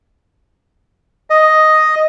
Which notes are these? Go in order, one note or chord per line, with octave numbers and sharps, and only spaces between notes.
D#5